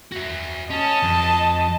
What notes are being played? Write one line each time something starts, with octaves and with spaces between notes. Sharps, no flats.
F#4 E5
C#4 D#5 A5
F2